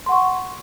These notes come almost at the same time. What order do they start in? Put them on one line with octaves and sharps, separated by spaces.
C6 F#5 C#6